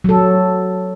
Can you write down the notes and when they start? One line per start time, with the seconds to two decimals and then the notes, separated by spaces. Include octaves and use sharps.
0.04 F#3 A4